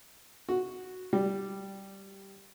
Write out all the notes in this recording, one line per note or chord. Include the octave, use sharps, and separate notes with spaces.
F#4
G3